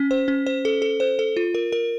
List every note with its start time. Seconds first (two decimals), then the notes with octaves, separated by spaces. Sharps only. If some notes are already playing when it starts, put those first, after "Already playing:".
Already playing: C#4
0.11 C5
0.28 C#4
0.46 C5
0.65 A4
0.82 A4
1.00 C5
1.19 A4
1.37 F4
1.54 A#4
1.72 A#4